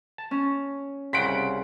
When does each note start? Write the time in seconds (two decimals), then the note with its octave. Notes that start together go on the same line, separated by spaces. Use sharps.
0.18 A5
0.31 C#4
1.13 C2 C#3 F#5 C6 B6 D7